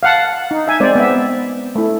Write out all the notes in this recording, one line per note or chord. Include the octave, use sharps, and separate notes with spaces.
F5 F#5 A5
D#4
E5 G#5
G#3 C4 C5 D5
B3 E5
A3 E4